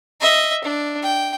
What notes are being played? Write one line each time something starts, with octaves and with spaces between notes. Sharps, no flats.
D#5 E5
D4
G5